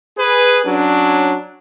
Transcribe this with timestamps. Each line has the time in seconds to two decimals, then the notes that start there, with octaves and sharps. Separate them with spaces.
0.18 G#4 B4
0.66 F#3 C#4 D4